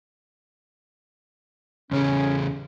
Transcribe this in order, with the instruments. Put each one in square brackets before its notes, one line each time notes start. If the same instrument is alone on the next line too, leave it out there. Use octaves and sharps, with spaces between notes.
[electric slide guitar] E2 C#3 G#4 [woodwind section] C#4